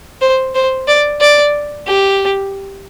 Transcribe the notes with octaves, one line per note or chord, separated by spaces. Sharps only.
C5
C5
D5
D5
G4